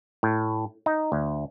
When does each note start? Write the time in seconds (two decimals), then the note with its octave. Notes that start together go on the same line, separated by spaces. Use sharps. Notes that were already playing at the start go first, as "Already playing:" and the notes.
0.23 A2
0.86 D#4
1.12 D2